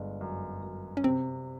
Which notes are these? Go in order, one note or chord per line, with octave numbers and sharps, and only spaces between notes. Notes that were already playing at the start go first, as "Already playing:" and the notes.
Already playing: G1 G#3
F#2
F#2
C#4
C3 C4